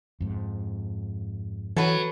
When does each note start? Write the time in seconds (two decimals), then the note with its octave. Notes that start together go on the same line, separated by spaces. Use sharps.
0.21 F2 G#2
1.76 E3 F#3 A4 B4